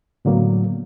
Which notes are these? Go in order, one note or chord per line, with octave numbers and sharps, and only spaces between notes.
A2 D3 F#3 A#3 B3